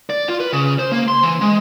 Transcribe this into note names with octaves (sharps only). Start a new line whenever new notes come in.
D5
F4
B4
C#3
C5
A#3
C6
E3
G#3